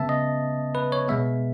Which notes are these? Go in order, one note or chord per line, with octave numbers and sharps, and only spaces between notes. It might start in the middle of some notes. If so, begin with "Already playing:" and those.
Already playing: C#3 G#3 B3 E5 A5
D#5
B4
C#5
B2 G#3 B3 E5